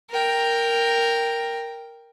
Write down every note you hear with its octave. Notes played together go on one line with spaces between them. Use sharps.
A#4 G5